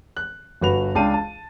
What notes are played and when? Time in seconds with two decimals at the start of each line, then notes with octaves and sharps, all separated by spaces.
0.17 F#6
0.61 G1 F#4 B4 F7
0.95 C#2 D4 F5 G5 A5 D#7
1.14 A5